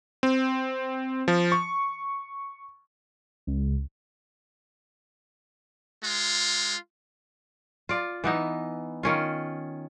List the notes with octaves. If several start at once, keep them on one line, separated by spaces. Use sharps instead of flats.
C4
F3
C#6
C#2
G#3 F4
F4 D5
E3 B3 D#4
D#3 C#4 F4